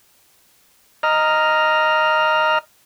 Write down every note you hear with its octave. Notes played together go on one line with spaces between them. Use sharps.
D#5 A#5 F6